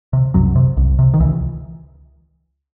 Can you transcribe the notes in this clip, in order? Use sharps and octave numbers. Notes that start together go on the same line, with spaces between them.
C3
C2 F#2 F#3
C3
C2
C3
D#3
C#2 E3